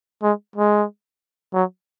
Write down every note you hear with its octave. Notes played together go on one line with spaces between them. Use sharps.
G#3
G#3
F#3